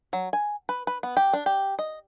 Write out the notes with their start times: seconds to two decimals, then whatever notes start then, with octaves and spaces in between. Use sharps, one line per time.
0.13 F#3
0.33 G#5
0.69 B4
0.87 B4
1.03 B3
1.17 G4
1.33 D4
1.46 G4
1.79 D#5